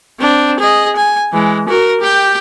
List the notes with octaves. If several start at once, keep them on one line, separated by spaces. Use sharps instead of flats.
C4 D4
G#4 D#5
G#5
E3 G#3
F#4 A#4
G4 G5